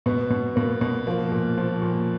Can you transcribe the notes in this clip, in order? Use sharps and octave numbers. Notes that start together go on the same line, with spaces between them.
B2 B3
B2
B2 A#3
B2
F3 A#3
A#2
F3
A#2